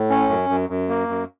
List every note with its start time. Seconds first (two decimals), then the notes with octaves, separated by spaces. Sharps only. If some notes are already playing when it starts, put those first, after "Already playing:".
Already playing: A2
0.10 C#4
0.29 F#2
0.49 F#2
0.69 F#2
0.89 A#3
1.09 F#2